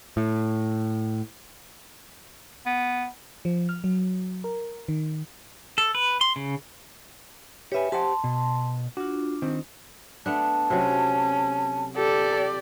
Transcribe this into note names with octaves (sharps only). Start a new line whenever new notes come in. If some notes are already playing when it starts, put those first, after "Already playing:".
A2
B3
F3
F6
F#3
A#4
D#3
A4
B4
C6
C#3
G4 B4 C#5 E5 G#5
G4 C5 F#5 A5 C6
B2
D4 F4 F#4
D#3 C4
A3 B3 D4 A5
C3 F#3 C#4
G4 A4 D5